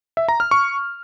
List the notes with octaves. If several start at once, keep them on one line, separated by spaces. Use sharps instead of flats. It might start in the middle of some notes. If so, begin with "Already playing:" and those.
E5
A#5
F6
C#6